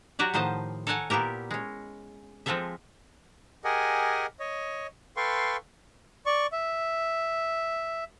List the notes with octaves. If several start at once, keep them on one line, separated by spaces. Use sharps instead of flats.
F#3 F#4 G4 D5
A2 D#3 F3 C5 D#5 A5
A4 A#4 C#5 F#5 G#5 A5
A#2 B3 E4 G4 A#4
G#3 C#4
F3 G#3 C4 F4 A4 E5
G4 G#4 A#4 D#5 F#5 G#5
C#5 D#5
A4 B4 F5 G5 C6 C#6
D5 C#6
E5